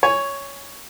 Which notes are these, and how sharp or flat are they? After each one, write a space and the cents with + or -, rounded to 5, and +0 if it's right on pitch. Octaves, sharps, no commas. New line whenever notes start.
C#5 +5 G#5 -5